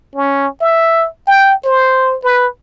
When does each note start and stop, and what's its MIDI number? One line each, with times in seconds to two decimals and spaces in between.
0.15 0.48 61
0.61 1.07 76
1.27 1.54 79
1.65 2.16 72
2.24 2.47 71